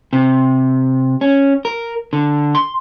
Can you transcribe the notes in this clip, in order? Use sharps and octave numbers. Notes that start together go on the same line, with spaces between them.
C3
C#4
A#4
D3
C6